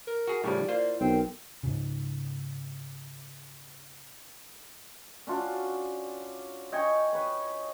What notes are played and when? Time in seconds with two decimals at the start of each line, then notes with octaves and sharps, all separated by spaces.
0.07 A#4
0.28 F#4 G#4
0.44 A2 C#3 F3 G3 E4 D5
0.68 A#3 F4 C5
1.01 B1 C4 A#4 G5
1.63 G#2 C#3
5.27 C#4 D4 F4 F#4
6.72 D#5 G5 G#5 C#6
7.13 B4 C#5